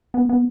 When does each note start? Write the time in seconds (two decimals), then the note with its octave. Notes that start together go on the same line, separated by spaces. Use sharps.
0.14 B3
0.29 B3